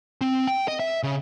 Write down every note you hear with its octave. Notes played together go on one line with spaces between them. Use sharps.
C4
G5
D#5
E5
C#3